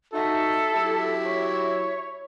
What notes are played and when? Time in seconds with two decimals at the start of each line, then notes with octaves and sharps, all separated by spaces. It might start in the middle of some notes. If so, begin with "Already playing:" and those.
0.14 D#4 F#4 A4 E5
0.71 F#3 E4 G4
1.26 C#5